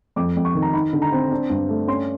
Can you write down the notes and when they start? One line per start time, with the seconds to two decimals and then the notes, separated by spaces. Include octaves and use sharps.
0.16 F2 D6
0.37 F2
0.45 C#6
0.55 D#3
0.62 A#5
0.73 D#4 B5
0.93 D3
1.02 A#5
1.12 C4
1.32 D4
1.50 G2
1.69 A3
1.88 C#4 C6